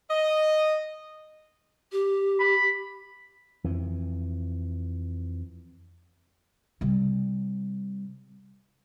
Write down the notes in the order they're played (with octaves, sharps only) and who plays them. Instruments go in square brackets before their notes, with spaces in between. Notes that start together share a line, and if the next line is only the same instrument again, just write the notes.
[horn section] D#5
[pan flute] G4
[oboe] B5
[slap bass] F2 E3
[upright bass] C3 G3